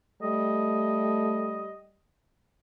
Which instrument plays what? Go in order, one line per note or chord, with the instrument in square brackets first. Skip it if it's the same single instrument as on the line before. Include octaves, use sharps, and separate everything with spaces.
[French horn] G3 [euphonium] A3 [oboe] D#5